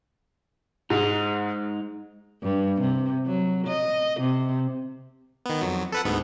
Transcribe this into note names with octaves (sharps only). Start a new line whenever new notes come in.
G#2 G#3 D#4
G2
C3
F#3
D#5
C3
D#3 B3
F2 F#3
A4 B4 F#5
D2 G#2 B3